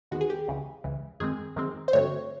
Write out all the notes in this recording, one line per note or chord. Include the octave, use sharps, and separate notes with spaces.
D#2 D#3 G#3 B3 F#4
G#4
G4
C#2 C#3 E3
C#2 C#3 E3
F#2 D#3 G#3 C4 G#4
F#2 D#3 G#3 C4
C5
G2 D3 F#3 A3 C4 C#5